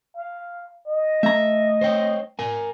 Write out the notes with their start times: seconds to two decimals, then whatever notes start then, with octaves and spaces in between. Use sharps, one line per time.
0.16 F5
0.87 D#5
1.23 A3 E5 A#5
1.81 C5 C#5 G5
2.39 A#4 G#5